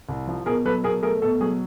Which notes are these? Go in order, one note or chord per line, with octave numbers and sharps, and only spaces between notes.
C2
F3
B2 G#4 A#4
F#3 A4 B4
B2 G#4 A#4
A3 G#4 A#4
B2 A4
F#3 G#4